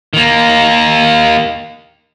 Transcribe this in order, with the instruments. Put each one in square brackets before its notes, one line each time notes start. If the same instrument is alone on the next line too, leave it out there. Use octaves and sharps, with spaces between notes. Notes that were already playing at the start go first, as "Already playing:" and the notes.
[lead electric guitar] D#3 A#3